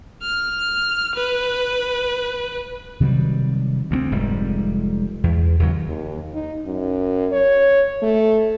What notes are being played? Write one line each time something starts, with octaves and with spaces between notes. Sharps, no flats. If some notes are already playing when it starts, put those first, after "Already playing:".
F6
B4
C3 D#3 F#3 G3
D2 G#3 C4
F1 G#2 G3
E2
D#2 C#3 F3 F#3
D#2
D#4
F#2
C#5
A3